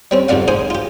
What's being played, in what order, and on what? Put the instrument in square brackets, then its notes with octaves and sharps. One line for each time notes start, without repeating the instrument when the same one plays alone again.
[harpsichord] G3 C4 C#4
C2 F2 G#2 D5 F5 F#5
G#2 C5 G#5 D#6
F4 G4